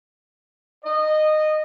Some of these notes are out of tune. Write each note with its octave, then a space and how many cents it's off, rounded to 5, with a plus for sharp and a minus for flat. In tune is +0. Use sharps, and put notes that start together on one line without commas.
D#5 -15